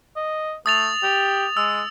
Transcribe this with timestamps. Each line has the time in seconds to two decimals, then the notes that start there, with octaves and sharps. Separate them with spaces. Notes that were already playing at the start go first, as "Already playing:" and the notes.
0.16 D#5
0.66 A3 D#6 A6 F7
1.03 G4
1.57 G#3 E6